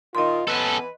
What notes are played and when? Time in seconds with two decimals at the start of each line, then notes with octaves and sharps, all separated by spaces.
0.15 A#2 D#3 F4 D#5 C6
0.48 E3 B3 C#4 A4 B4